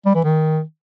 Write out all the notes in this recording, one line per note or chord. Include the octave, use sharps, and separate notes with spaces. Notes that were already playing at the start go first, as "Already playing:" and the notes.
G3
E3
D#3